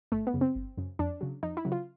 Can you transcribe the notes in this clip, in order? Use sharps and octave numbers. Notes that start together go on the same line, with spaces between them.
G1 A3
B3
F#2 C#3
C4
G1
F#2 C#3
F2 D4
C#3 F#3
F2 D#4
E4
C#3 F#3
F4